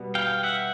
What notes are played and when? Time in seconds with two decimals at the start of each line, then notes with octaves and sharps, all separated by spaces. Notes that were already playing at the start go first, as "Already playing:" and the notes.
Already playing: B2 G3 B3
0.15 F5 G5
0.43 E5 F#5